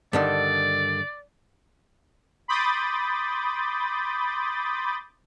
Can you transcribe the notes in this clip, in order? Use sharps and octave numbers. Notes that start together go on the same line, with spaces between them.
G2 D3 D#3 D5
B5 C6 D6 D#6 G6 A6